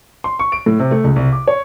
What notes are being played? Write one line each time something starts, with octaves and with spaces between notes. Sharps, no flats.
C6
C#6
D7
A2
C3
A3
C#2
C2
D6
C#5